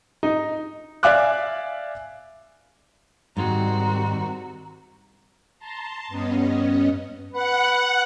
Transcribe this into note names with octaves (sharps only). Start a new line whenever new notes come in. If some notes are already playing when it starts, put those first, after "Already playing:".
D#4
D5 E5 F5 G#5 D6 F#6
G#2 D#3 G3 C4 F#4 A#5
A5 A#5 C6
G2 B3 C#4 D#5
B4 F#5